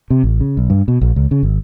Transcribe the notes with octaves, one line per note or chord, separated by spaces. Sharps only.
C3
A1
C#3
B1
G2
B2
A#1
C#2
C#3
G#1